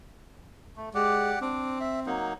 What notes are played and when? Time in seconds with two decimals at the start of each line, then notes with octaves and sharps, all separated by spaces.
0.77 A3
0.95 G#3 G4 D5 F#5
1.42 C4 D4 D6
1.81 E5
2.07 F#3 A#3 D#4